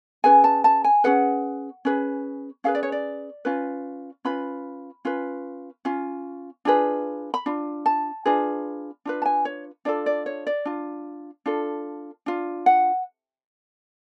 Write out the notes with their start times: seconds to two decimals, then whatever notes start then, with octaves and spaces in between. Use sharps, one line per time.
0.24 C#4 G#4 B4 G#5
0.44 A5
0.64 A5
0.84 G#5
1.04 C#4 G#4 B4 F#5
1.85 C#4 G#4 B4
2.64 C#4 G#4 B4 F5
2.75 D5
2.83 C#5
2.92 D5
3.45 C#4 F4 B4
4.25 C#4 F4 B4 B5
5.05 C#4 F4 B4
5.85 C#4 F4
6.65 D4 F4 G#4 B4
7.34 B5
7.46 D4 F4
7.86 A5
8.25 D4 F4 G#4 B4
9.05 D4 F4 B4
9.22 A5
9.25 G#5
9.45 C#5
9.85 D4 F4 A4 D5
10.06 D5
10.26 C#5
10.47 D5
10.65 D4 F4
11.46 D4 F4 A4
12.26 D4 F4
12.66 F#5